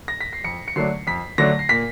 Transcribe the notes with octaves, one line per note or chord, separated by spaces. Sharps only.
A#6
B6
C7
F2 C#7
C#7
D3 F#3 A3 D4 C7
F2 B6
D3 F#3 A3 D4 A#6
C7
A#2 B6